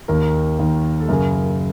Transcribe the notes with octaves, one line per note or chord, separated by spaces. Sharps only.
D#2 D#3 A#4
D#2 D#3
A4
F#2 C#3 A#4